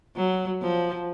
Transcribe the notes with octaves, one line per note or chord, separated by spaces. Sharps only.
F#3
F3